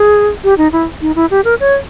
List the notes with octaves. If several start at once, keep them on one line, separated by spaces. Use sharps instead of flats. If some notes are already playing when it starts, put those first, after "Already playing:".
Already playing: G#4
G4
D#4
E4
D#4
E4
G4
A#4
C#5